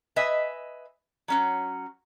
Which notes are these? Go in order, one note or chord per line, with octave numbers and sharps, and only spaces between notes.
B4 D#5 E5 G#5
F#3 C#4 F#4